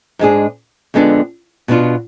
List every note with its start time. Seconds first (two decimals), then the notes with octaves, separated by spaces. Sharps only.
0.19 G#2 G#3 D4 G#4
0.94 F2 D3 G#3 B3 D4
1.68 B2 B3 D4 F4